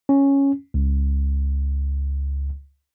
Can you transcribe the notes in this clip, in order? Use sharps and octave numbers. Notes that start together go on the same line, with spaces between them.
C#4
C#2